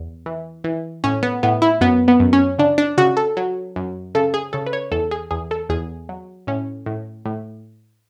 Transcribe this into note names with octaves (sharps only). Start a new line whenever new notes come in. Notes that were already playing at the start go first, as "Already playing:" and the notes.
Already playing: E2
E3
E3
A2 C#4
B3
A2 B3
E4
F#2 B3
B3
F#2
C#4
C#3 D4
D4
C#3 F#4
A4
F#3
F#2
C#3 A4
G#4
C#3 A4
B4
C#5
E2 A4
G#4
E2 G#4
A4
E2 G#4
F#3
A2 C#4
A2
A2